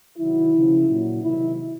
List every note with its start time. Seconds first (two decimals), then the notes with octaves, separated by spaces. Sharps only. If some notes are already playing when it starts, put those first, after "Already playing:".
0.18 C3 D#3 F#3 E4
0.53 C#3 F3
0.87 A#2 F#3
1.22 C3 D#3 F#3 E4